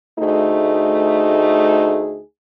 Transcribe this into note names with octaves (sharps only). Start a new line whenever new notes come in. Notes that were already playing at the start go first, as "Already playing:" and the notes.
D2 A3 D#4 G#4